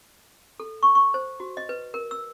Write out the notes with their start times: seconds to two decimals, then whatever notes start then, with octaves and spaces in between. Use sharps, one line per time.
0.60 A4
0.83 C#6
0.95 C#6
1.14 C5
1.40 F#4
1.57 D#5
1.69 B4
1.94 A#4
2.11 E6